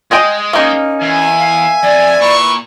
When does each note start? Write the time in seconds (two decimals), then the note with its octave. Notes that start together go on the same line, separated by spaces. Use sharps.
0.11 G#3 G#4 D#5 G5
0.53 A#3 C#4 D#4
1.01 E2 E5 G#5
1.40 F5
1.83 F2 D5
2.20 A#2 E4 B4 C#6